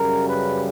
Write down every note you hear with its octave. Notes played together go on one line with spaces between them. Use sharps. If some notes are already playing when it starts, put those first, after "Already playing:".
Already playing: F#2 C#3 G3 A#4
B4